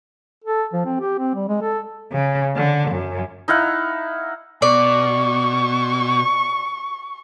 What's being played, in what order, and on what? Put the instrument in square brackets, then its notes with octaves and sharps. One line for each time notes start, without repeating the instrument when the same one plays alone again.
[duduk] A4
F3
C4
G4
C4
G3
G#3
A4
[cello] C#3
D3
F#2
[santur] D#4 E4 F5 F#5
[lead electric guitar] B2 [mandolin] D5 [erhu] C#6